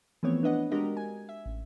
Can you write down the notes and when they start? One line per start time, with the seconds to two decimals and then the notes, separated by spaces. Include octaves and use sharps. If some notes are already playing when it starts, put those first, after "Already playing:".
0.23 E3 F3 A3 B3 C4 C#5
0.43 D4 B4 D#5 F#5
0.71 G#3 D4 F#4 G4 A#4 D#5
0.97 G#5
1.29 E5
1.46 A1